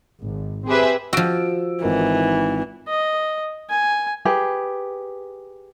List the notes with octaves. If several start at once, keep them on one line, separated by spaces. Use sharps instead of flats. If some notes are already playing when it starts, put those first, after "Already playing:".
G#1
C4 G4 G#4 B4 E5
F3 F#4 E6 D7
G#1 D#3 E3 A#4
D#5
G#5
G4 G#4 B4